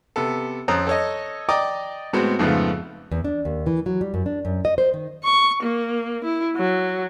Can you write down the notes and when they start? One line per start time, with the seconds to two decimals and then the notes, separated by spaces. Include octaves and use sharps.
0.16 C3 B3 A4
0.68 F2 C4 C#4 A#5 D#6
0.87 A4 C#5 D#5
1.49 D5 D#5 G5 A#5 D6 D#6
2.13 A2 G#3 B3 C4 F#4
2.39 F2 G#2 C#3 F3 A3 B3
3.11 E2
3.24 D4
3.45 D#2
3.67 E3
3.86 F#3
4.01 G3
4.14 F#2
4.26 D4
4.45 F#2
4.65 D#5
4.78 C5
4.94 D#3
5.24 C#6
5.63 A#3
6.24 E4
6.56 F#3